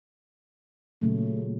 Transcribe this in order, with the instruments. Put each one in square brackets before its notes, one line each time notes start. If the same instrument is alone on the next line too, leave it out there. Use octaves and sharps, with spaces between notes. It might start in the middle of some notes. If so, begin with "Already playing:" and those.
[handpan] A#2 C#3 F#3 [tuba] A3